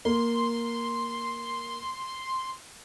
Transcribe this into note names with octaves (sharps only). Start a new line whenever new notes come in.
A#3 C6